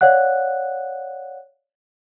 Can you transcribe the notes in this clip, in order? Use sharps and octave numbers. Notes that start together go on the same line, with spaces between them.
C#5 D5 F5 F#5 F#6